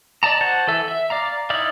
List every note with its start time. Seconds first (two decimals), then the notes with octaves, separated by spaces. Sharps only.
0.23 D5 D#5 A5 A#5
0.41 F#4 C5 F#5 A5
0.67 E3 A4 E5
0.88 E5
1.10 D5 F5 A#5
1.50 D#4 E4 D5 E5 F5